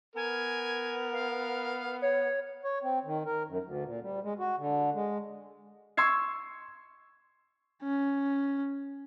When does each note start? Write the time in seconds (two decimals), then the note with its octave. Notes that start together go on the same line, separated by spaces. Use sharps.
0.16 B3 A#4 G#5
1.13 F5
2.02 C#5 C#7
2.65 C#5
2.83 C4
3.05 D#3
3.26 A#4
3.47 F#2
3.63 D2
3.85 A#2
4.02 G3
4.23 G#3
4.39 F#4
4.58 D3
4.94 G#3
5.97 C6 C#6 E6 G#6 C7
7.83 C#4